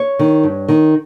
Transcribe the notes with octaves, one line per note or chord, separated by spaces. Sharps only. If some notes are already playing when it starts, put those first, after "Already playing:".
Already playing: C#5
D#3
G2
D#3